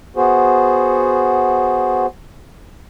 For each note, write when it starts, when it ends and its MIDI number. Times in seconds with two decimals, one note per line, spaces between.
0.16 2.06 59
0.16 2.06 66
0.16 2.06 68
0.16 2.06 72